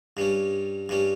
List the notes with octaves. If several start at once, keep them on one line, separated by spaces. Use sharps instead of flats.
G2 G3 C#4
G2 G3 C#4